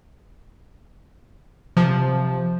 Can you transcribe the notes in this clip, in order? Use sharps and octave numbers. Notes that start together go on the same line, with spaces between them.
C3 F3